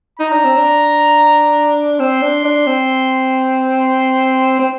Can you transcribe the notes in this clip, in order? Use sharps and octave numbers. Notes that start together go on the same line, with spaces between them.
D#4 A#5
D4
C4
D4
C4 C6
D4
D4
C4
C6
C4